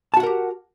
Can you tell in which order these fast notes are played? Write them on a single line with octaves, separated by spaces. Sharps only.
A5 F#4 F#5 A#4 G4